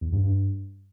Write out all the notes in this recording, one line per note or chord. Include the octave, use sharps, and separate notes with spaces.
E2
G2
G2